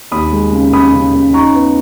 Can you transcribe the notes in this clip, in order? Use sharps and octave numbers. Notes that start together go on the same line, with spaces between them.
D#2 B5 D#6
G#3
C#3
C#3 B5 D#6
C#3
C#3
D#4 A#5 C#6
B3